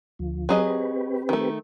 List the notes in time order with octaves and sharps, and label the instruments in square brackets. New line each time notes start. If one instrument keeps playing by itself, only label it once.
[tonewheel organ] D2 F3
[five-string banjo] F#3 G#4 D#5 [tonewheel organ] C4 G4 B4
[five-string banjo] D#3 A3